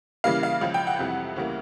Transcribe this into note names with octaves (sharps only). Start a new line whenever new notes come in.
C#3 E3 G3 A#3 F5
F5
C#2 C#3 F3
G5
F#5
F2 C3 E3 G3
D2 C#3 E3 G3 A#3